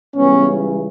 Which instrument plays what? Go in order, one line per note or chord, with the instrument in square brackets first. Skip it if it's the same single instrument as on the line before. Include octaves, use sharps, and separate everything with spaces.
[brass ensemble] C#2 C#3 E3 G3 B3 C#4